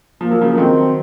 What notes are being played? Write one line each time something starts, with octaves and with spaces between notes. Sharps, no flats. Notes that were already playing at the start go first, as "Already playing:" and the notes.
F3 A#3
F#3
C#3 F3
A#3
A3
D#3 F#3 C4